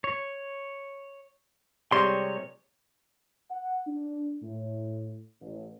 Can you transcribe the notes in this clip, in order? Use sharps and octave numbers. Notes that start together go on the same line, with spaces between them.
C#5
C3 G3 G#3 C#5 C6
F#5
D4
A2
A1